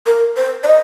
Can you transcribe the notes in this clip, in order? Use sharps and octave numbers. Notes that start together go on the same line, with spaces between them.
A#4
C5
D5
D#5